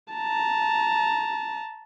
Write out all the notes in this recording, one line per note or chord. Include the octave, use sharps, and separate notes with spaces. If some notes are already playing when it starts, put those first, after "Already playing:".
A5 A#5